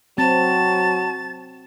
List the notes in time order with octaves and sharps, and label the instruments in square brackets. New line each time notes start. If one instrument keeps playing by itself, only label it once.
[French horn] F#3 [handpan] C4 [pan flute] A5 [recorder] A6